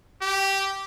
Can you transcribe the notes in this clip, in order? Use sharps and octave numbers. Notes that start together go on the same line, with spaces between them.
G4